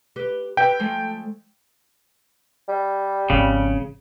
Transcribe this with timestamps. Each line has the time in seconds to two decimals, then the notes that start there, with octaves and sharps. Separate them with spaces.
0.16 G4 B4
0.57 G4 B4 E5 G5
0.80 F3 G#3 A3
2.68 G3
3.30 G#1 C#3 F3